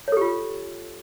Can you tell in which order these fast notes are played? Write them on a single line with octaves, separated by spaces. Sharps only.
C#5 A4 G4 F4